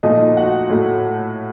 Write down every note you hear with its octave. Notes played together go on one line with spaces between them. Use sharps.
A#2 F3 A3 D#4 D#5
F#4 F#5
A2 F#3 A3